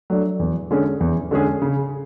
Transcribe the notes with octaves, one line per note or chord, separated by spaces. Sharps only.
F#3 A3 D4 A4
E2
D3 G#3 C#4 G#4
E2
D3 G#3 C#4 G#4
C#3